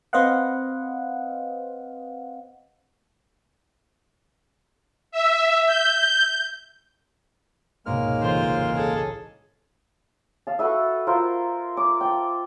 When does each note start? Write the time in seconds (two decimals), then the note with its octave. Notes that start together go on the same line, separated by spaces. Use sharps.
0.13 C4 B4 C5 D#5 F5 F#5
5.12 E5
5.66 G6
7.86 C#2 G#2 B2 G#3 A#3 F6
8.21 A1 F4 C5
8.75 G#4 A4
10.47 F5 A5
10.59 F#4 A4 B4 E5
11.07 F4 A#4 C5
11.77 D6
12.01 G5 A5